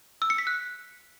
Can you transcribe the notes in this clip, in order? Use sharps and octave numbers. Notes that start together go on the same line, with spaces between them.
E6
C#7
B6
F#6